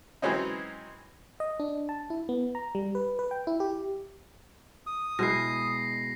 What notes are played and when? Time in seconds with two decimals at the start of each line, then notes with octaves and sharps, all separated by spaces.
0.22 E3 F#3 G#3 C4 C#4 D#4
1.40 D#5
1.60 D4
1.89 A5
2.10 E4
2.29 B3
2.55 A#5
2.75 G3
2.95 B4
3.19 B4
3.31 G5
3.47 E4
3.60 G4
4.87 D#6
5.19 B2 G#3 E4 A#6 C7